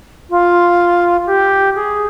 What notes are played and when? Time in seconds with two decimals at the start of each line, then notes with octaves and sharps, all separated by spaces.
0.30 F4
1.27 G4
1.75 G#4